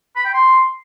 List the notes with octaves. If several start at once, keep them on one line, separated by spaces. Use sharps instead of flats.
B5
G5
C6